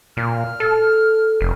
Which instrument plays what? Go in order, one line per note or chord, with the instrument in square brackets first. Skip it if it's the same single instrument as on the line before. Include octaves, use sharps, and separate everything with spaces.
[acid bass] A#2 [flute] F6
[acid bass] A4
F1